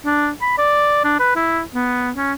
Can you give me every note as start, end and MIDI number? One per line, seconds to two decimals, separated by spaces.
0.05 0.30 62
0.41 0.55 83
0.58 1.00 74
1.04 1.16 62
1.20 1.35 71
1.36 1.61 64
1.74 2.10 59
2.16 2.33 61